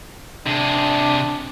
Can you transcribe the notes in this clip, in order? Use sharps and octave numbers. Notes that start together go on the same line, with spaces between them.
C3 D4 G#4